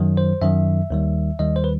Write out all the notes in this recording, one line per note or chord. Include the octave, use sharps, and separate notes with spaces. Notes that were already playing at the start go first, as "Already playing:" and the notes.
Already playing: F#2 D#3 F#3
C5
F#2 D#3 F#3 E5
D#2 D#3 G3
D#2 D#3 G3 D#5
C5
B4